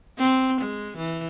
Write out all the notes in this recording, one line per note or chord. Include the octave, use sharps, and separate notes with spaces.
C4
G#3
E3